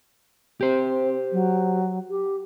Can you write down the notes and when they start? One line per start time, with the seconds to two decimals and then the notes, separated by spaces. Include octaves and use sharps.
0.61 C4 G4 C5
1.32 F#3
2.09 G4